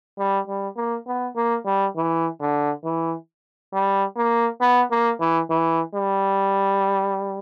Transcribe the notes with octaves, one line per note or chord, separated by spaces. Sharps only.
G3
G3
A#3
B3
A#3
G3
E3
D3
E3
G3
A#3
B3
A#3
E3
E3
G3